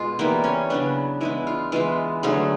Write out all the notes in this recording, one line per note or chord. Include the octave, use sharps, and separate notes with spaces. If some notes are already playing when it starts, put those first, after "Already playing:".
Already playing: B2 G#3 F4
E3 G3 A#3 B3
C#4
C#3 F#3 B3 D4
E3 G#3 B3 E4
F4
E3 G#3 B3 F4
D3 F#3 A3 G#4